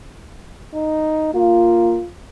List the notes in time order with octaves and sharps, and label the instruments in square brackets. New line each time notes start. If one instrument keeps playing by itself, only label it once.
[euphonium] D#4
[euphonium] A#3 [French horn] F4